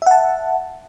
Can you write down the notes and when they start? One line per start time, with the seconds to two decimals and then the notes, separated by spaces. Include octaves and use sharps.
0.02 E5
0.06 F#5
0.11 A5